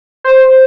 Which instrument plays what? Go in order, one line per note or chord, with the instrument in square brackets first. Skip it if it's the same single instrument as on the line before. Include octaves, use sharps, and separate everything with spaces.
[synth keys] C5